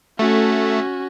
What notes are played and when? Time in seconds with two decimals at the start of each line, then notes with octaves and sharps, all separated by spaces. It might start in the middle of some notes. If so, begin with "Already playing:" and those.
0.19 A3 C#4 F#4